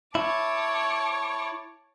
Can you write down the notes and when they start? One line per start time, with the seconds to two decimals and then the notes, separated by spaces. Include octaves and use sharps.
0.15 E4 C#5 A5 D6